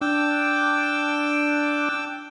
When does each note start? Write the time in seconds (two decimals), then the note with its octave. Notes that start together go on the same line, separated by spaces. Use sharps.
0.01 D4 G5 D6 E6